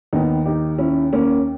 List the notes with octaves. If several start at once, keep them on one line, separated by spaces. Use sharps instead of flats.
D#2 D#3 B3 D#4
D#4 G4
C#4 E4
A#3 C#4